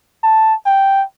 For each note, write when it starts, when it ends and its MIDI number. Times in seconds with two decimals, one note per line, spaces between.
0.24 0.54 81
0.66 1.04 79